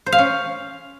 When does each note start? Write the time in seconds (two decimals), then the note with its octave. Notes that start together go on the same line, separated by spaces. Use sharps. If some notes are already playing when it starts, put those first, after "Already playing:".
0.06 C5
0.12 F5
0.19 C#4